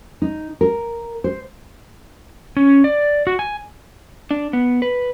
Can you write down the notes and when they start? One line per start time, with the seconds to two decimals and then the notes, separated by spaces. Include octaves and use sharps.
0.22 D#4
0.61 A#4
1.24 C5
2.57 C#4
2.84 D5
3.27 F#4
3.39 G#5
4.31 D4
4.53 B3
4.82 B4